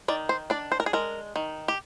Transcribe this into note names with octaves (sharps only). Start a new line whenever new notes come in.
D#3 D5
C5
D4 D5
C5
A#4
G#4
G#3 A#4
D#3
G4